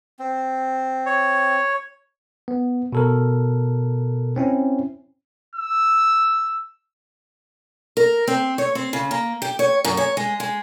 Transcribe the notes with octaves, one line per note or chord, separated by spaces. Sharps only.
C4
C#5
B3
B2 A4 A#4
C4 C#4 E4
E6
A#4
C4
C#5
C4
C#3
A#3
G4
C#5
F#2
C#5
G#3
G#3